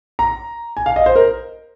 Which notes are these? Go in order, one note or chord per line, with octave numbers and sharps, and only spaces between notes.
A#5
G#5
F5
D#5
C5
A#4